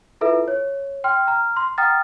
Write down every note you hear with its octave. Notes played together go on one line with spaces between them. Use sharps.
E4 F4 A4 B4 E5
C#5
G5 C6 F6
A#5 F6
C6
F#5 G5 A#5 D#6 F6 A6